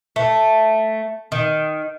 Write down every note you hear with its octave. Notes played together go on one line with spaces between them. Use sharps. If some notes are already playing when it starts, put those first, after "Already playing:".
A3
D#3